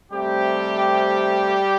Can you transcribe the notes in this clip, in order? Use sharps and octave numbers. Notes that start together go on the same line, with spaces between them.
C3 G3 A3 C4 G4